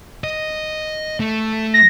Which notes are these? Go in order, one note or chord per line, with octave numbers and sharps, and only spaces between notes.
D#5
A3
A#6